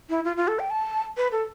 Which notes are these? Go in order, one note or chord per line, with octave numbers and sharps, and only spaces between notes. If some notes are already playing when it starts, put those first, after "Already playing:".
E4
F4
F4
A4
G5
A5
B4
A4